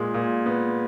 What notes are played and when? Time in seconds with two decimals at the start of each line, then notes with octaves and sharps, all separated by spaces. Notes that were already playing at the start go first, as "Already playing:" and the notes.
Already playing: A#2 G#3
0.14 A#2
0.46 B3